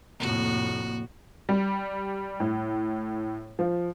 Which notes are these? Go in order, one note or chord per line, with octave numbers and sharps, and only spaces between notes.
F1 A2 A#3 F#4
G3
A2
F3